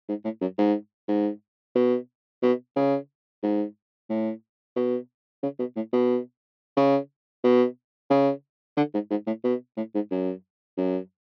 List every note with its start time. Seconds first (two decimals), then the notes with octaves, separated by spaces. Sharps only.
0.09 G#2
0.24 A2
0.41 F#2
0.58 G#2
1.08 G#2
1.76 B2
2.42 B2
2.76 C#3
3.43 G#2
4.10 A2
4.76 B2
5.43 C#3
5.59 B2
5.76 A2
5.93 B2
6.77 C#3
7.44 B2
8.10 C#3
8.77 D3
8.94 G#2
9.11 G#2
9.27 A2
9.44 B2
9.77 A2
9.95 G#2
10.11 F#2
10.78 F#2